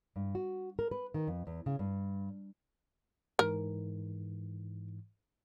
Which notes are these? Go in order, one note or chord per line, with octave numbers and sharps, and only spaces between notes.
G2
F#4
A#4
B4
D#3
F2
E2
C#3
G2
G#2 E3 A#4